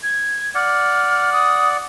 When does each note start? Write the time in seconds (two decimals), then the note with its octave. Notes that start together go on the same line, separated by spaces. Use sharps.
0.03 G#6
0.55 D5 F#5 F6
1.33 D#6